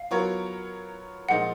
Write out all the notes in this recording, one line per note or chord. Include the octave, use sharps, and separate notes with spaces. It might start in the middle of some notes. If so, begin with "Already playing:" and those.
Already playing: F5
F#3 B3 F4 A#4 C#5
A#2 F3 G#3 D#4 A#4 F#5